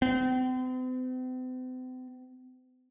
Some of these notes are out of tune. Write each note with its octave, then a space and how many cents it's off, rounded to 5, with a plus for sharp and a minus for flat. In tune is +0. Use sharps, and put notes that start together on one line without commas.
C4 -45